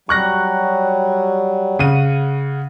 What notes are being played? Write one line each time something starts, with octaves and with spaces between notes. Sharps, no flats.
F#3 G3 C#6 F#6 A#6
C#3 F#5 D#7